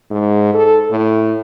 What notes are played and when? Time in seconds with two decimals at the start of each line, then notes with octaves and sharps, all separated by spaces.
0.11 G#2
0.54 A4
0.91 A2